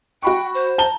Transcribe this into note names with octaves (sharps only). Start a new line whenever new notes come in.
F#4 G5 B5 C#6
C5
A5 A#5 G7